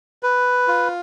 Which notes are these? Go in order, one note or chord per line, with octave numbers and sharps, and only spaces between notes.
B4
F4